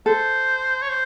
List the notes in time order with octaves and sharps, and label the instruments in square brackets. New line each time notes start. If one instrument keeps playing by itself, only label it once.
[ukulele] A4 [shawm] C5
[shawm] C#5
C5